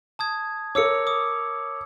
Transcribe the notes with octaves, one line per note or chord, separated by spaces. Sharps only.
A5 D#6 G#6
A#4 C#5 D6 E6 C#7
D6 D#6